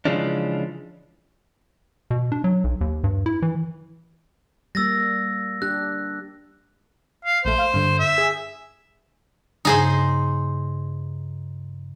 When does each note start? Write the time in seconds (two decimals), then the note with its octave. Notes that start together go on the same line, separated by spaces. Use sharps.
0.05 C#3 E3 F3 G#3 C#4 D4
2.11 B2
2.32 D4
2.44 F#3
2.64 B1
2.81 D#2
3.04 G2
3.26 E4
3.42 E3
4.75 G3 A#3 E6 A6 A#6
5.62 D4 G4 F#6
7.25 F5
7.45 A#1 A3 C5
7.58 F5
7.74 G2 D3
7.99 E5
8.18 G#4
9.65 G2 C#3 D#4 G#4 C5